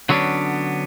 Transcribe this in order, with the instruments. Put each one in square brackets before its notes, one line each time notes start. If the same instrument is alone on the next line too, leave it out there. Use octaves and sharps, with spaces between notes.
[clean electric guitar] D3 F#3 G#3 B3 C#4 D4